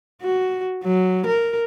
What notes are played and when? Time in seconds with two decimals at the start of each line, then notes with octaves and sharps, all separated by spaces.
0.22 F#4
0.84 F#3
1.26 A#4